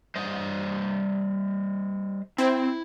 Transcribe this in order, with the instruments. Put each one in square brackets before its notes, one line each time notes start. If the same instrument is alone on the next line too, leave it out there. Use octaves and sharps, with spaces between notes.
[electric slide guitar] G3 C5 D#5
[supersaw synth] C4 [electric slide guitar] E4